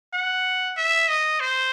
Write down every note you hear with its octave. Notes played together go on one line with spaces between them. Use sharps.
F#5
E5
D#5
C5